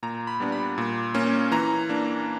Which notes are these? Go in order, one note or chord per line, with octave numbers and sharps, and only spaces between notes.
A#2 A#5
B5
G3 B3 D4
B5
A#2
A#3 C#4
E3 A#5
A#3 D4